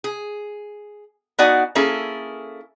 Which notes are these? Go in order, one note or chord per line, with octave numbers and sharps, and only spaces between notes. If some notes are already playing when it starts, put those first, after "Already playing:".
G#4
B3 D#4 F#4 D5 F#5 G#5
A#3 C#4 E4 G#4 A4